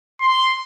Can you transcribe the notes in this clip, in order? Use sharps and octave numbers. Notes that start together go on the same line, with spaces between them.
C6